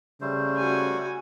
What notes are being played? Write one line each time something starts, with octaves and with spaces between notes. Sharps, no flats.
C#3 G3 A3 C5
F#4 G#5